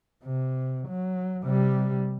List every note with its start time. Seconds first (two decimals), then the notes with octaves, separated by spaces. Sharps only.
0.24 C3
0.88 F#3
1.43 C3 G3